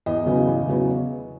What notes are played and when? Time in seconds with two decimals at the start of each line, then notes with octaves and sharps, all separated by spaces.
0.06 E2 D#5
0.26 C#3 F#3 B3
0.47 E2
0.67 C#3 F#3 B3